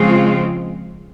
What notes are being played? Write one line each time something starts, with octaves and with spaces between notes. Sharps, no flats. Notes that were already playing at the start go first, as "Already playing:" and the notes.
Already playing: C#3 F3 G#3 C4 F4